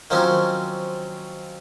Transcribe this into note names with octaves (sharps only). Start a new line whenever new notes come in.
D#3 F3 F#3 A#3 C4 C#4